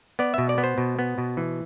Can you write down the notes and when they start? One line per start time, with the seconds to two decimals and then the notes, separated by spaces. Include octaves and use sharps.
0.19 B3 D5
0.34 B2 E5
0.49 D5
0.58 B3
0.64 C5
0.78 B2
0.99 B3
1.18 B2
1.37 E3